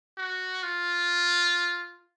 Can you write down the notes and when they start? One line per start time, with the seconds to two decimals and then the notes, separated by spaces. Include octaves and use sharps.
0.17 F#4
0.63 F4